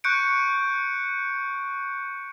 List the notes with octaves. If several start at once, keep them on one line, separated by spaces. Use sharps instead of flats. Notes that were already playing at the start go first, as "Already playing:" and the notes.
C#6 F#6 G6 C#7 D7